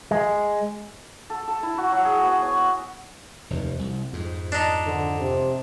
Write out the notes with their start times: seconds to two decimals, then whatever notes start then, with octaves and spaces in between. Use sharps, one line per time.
0.11 G#3
1.30 A4
1.48 A4
1.63 E4
1.78 F#4
1.92 F#3
2.05 G#4
2.23 B3
2.42 C#5
2.58 E5
3.50 F1 D#2
3.79 C2
4.13 F2 G#2
4.52 D4 D#4
4.86 D3
5.20 C3